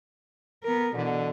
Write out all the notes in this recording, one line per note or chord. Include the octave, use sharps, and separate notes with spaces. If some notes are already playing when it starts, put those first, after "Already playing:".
B3 A#4
B2 D3 E3